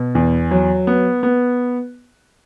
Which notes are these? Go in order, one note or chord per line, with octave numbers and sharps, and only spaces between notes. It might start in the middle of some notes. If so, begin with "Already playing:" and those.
Already playing: B2
E2
F#3
B3
B3